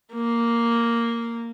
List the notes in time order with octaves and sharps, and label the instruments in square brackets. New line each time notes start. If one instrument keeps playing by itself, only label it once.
[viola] A#3